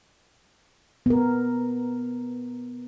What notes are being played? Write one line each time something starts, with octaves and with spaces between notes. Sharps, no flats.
B3 A#4